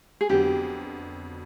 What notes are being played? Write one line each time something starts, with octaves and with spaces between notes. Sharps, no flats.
G#4
F2 D3 F#3 B3 G4